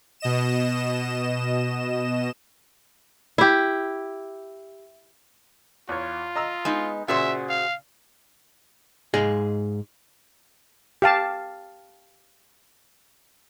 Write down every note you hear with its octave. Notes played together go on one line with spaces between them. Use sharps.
B2 D#5 E7
E4 G4
E2 F4 C#5
D#5 A#5 E6
G#3 B3 D#4
A#2 C#3 F#4 G#4 C5 E5
F5
G#2 G#4 D#5 F5
G4 F5 A5